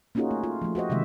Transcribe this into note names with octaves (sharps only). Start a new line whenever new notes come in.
A#3 C#4 D#4 F4 F#4 G#4
A3
F4
F3 A3
F#4 G4 C5 D#5
C3 D#3 E3 G#3 E5